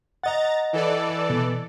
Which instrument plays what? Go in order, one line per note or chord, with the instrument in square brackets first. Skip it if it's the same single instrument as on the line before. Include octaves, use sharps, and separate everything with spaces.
[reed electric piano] D#5 F#5 [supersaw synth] A#5 A6
[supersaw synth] E3 A4 D5
[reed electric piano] B2